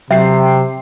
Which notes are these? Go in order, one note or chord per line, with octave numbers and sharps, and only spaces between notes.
C3 F#3 E5 G5 C7